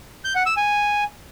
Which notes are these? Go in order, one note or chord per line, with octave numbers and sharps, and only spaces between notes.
G6
F#5
E6
G#5